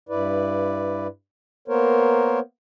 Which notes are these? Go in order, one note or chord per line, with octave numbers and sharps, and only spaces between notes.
G2 E4 B4 D5
A#3 B3 A#4 C5 C#5